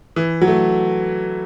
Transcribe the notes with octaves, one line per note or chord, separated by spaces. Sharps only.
E3
F#3
A3